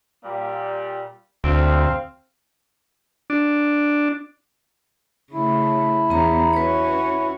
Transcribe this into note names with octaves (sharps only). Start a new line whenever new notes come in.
A#2 G3
D2 C4 F5
D4
C#3 A3 E4
E2 B3 C#4 A#5
C#4 F#4 B4 C#5